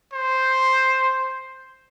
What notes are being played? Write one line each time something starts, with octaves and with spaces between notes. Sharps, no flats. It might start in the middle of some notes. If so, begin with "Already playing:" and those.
C5